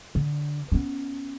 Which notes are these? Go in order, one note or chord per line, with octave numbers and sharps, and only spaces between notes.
D3
B3 C#4